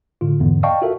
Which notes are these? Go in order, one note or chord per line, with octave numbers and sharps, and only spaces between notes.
A2 D3 F4
E2 G#2 D3
D5 D#5 F5 G5 A5 C#6
F4 F#4 A4 A#4 E5